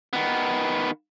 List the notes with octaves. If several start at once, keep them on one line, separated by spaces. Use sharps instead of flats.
D#3 B3